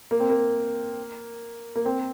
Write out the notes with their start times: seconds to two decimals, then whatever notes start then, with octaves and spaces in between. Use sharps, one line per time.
0.11 A#3
0.20 C4
0.30 A#3
1.75 A#3
1.85 C4